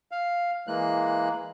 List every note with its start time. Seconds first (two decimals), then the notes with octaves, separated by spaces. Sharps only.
0.12 F5
0.67 E3 G#3 A#3 F#6